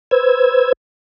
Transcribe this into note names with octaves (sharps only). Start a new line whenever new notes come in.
B4 C5 E6 G#6